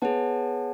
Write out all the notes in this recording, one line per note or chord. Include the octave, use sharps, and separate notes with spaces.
B3 G#4 C#5 F#5 A5